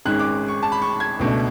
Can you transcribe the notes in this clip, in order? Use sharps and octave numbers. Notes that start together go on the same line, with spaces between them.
G#1 G#2 G#3 C#4 F#6
D6
C#6
A5
B5
C#6
G#6
C#2 B2 A3 D4